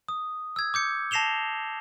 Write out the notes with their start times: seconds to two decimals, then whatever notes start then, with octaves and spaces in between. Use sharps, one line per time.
0.08 D#6
0.56 E6 G#6
0.74 D6 G6 C#7
1.11 A5 A#6 C7 E7 F7 G7